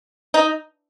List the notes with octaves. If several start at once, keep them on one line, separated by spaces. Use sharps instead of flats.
D#4